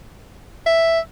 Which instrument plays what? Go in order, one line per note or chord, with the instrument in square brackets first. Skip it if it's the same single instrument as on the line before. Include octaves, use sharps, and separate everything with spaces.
[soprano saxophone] E5